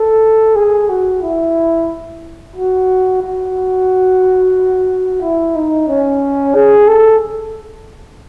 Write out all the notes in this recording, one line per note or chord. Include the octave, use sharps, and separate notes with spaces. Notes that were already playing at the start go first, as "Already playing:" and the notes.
Already playing: A4
G#4
F#4
E4
F#4
F#4
E4
D#4
C#4
G#4
A4